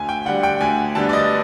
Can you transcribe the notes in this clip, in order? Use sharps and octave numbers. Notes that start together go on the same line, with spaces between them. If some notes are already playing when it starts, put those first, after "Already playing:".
Already playing: D2 G#5
G5
D3 G3 F#5
G5
D2 G#5
D3 G3 B3 A5
D5
D#5